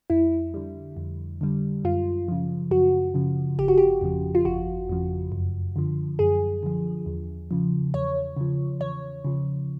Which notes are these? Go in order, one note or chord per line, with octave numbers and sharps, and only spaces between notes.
F2 E4
D3 G3
F2
D3 G3
F#2 F4
C#3 F3
F#2 F#4
C#3 F3
G1 G4
F#4
G4
F2 C#3 F3
F4
G1 F#4
F2 C#3 F3
F#2
D3 F3
F#2 G#4
D3 F3
E2
C#3 F3
E2 C#5
C#3 F3
E2 C#5
C#3 F3